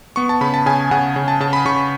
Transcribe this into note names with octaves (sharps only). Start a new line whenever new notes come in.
B3 C#6
A5
C#3 B5
A5
C#3 G#5
C#3 F#5
C#3
A5
C#3 A5
B5
C#3 C#6